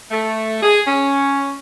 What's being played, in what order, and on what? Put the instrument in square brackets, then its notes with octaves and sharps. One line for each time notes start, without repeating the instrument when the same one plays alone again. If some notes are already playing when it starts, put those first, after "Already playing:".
[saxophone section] A3
G#4
C#4